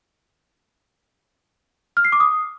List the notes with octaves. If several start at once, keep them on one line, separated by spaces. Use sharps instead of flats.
F6
C7
D6
D#6